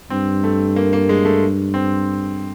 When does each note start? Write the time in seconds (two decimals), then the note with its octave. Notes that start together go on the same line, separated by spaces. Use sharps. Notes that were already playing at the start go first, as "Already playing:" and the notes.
0.10 G2 C4
0.44 A3
0.76 A#3
0.93 A#3
1.09 G#3
1.25 A3
1.74 C4